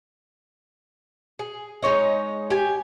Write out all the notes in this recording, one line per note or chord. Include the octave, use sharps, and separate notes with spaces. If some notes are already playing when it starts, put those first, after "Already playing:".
G#4
G#3 D#4 C#5 D#5
G4 G#5